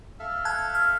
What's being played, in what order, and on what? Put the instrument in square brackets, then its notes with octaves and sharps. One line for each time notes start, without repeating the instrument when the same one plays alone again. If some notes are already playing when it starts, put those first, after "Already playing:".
[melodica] A4 E5 F5
[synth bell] A5 F#6 G#6
F6